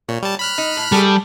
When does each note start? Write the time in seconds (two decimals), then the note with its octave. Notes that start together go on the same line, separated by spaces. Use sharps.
0.09 A#2 C#5
0.23 G3 A5
0.39 B5 F6 F#6
0.58 D#4
0.77 A2
0.92 G3 A3 G#4 A4